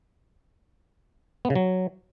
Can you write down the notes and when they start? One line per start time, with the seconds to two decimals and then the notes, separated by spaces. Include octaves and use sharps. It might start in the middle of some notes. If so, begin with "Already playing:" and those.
1.45 B3
1.50 C#3
1.55 F#3